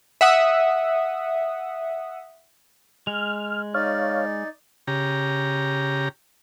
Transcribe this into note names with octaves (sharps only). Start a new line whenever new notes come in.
E5 F#5 D#6
G#3 F6
D#4 C#5 D5 F5
C#3 G4 A#5